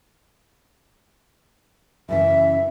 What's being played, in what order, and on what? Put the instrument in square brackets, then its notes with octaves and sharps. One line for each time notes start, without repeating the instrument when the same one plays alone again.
[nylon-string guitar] F#2 C#3 E3 [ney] E5